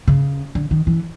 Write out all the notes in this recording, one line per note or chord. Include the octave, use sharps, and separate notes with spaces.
C#3
D3
D#3
E3